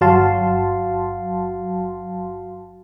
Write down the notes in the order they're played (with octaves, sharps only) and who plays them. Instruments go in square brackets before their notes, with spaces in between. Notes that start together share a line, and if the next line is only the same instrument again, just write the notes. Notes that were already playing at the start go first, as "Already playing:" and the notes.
[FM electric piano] G1 F#3 F#4 F5 A5 C6